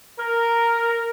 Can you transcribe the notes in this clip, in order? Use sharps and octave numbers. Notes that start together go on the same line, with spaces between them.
A#4